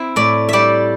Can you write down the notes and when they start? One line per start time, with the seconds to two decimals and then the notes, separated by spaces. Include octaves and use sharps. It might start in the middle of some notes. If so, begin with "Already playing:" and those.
Already playing: C4 E4 E5
0.16 A2 D5
0.49 G3 D5 E5